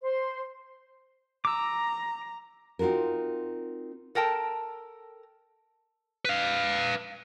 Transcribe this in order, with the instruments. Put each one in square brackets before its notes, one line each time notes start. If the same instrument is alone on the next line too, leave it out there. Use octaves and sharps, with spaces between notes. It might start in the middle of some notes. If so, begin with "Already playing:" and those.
[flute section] C5
[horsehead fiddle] A#5 [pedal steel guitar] D6 E6
[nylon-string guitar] C4 D#4 F4 F#4 A#4
[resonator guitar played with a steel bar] A4 A#4 G5 A5
[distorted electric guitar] B4 F5